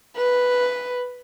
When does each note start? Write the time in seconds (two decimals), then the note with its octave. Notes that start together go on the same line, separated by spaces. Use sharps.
0.17 B4